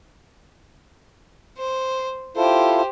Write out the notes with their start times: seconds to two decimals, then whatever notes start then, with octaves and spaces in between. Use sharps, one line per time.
1.58 C5
2.36 E4 F4 G4 A4 C5